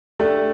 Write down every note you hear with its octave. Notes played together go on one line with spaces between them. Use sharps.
A3 D4 G4